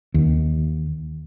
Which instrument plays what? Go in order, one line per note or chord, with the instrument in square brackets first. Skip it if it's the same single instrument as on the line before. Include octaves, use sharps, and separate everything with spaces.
[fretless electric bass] D#2